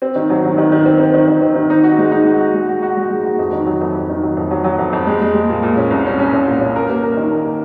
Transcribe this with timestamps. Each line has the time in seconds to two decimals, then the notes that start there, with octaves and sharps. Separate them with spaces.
0.02 C4
0.15 D#3
0.30 F#3
0.44 D#3
0.58 D#3
0.72 D#3
0.85 C4
0.99 C4
1.14 D#3
1.27 D#3
1.41 C4
1.56 D#3
1.70 D#4
1.83 F#4
1.98 G#3
2.12 D#4
2.26 F#4
2.40 F#4
2.54 G#3
2.68 F#4
2.82 F#4
2.97 G#3
3.10 G#3
3.25 F#4
3.39 F2
3.52 D#3
3.66 F#3
3.81 F2
3.95 F2
4.09 D#3
4.23 F#3
4.37 F2
4.51 F#3
4.64 F#3
4.79 F2
4.93 F2
5.07 G#3
5.21 G#3
5.35 G#3
5.49 A#2
5.63 A#2
5.77 C#4
5.91 C2
6.06 C#4
6.19 C#4
6.33 C2
6.47 A#2
6.61 C#4
6.76 A#4
6.89 A#3
7.03 A#4
7.17 D#3
7.31 A#4
7.45 A#4